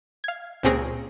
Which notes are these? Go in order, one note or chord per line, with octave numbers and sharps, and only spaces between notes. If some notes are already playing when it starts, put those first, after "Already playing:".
F5 G#6
C#2 A#2 C4 C#4 G#4 A#6